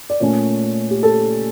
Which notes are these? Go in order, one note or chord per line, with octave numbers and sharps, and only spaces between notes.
D5
A#2 A3 C#4 C#5
G4
A4